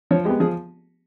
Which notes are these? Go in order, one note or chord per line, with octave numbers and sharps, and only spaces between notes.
F3 C#5
G#3 B3 G4
F3 G#4